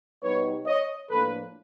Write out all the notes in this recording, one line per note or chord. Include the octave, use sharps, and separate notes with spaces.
B2 G3 B3 D#4 B4 C#5
C#5 D#5
A2 F3 A#3 D4 F4 A4 B4